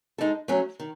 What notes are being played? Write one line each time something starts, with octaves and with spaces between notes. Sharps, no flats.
G#3 D#4 A4
F#3 A3 C#4
D#3